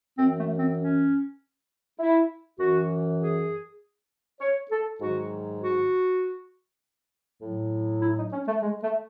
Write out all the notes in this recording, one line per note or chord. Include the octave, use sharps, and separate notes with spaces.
F#2 E3 C4
A3
C4
C#4
E4
F#2 E3 F#4
G#4
C#5
A4
G#2 D#3 F#3 F#4
F#4
A2 F#3
E4
D#4
C#4
A3
G#3
A3